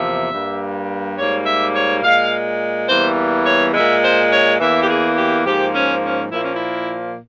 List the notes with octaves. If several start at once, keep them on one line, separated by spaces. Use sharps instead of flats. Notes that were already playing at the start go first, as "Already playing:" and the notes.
Already playing: E2 C3 F3 A#3 E5
G2 G3 A#3
G#2 G3 A#3 C#5
E5
C#5
A#2 G#3 F5
E2 E3 G3 A#3 C5
C#5
A#2 G#3 E5
C5
C#5
E2 E3 A#3 E5
G4
G#4
G4
G#2 F3 A#3 G4
C#4
C#4
A#2 F3 A#3 E4
C#4
E4